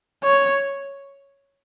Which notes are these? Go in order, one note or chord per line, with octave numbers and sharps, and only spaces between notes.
C#5